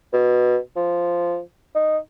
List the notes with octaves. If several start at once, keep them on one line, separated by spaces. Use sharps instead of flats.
B2
F3
D#4